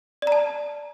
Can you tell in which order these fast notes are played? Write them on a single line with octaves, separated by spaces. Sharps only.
D5 A#5 A5